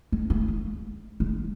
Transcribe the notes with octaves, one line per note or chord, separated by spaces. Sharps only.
G#3
A3
G#3
G#3